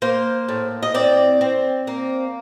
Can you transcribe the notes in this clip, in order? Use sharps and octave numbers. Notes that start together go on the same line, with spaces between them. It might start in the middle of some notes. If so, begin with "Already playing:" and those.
A#3 C5
A2
D#5
C4 D5
C4
A#3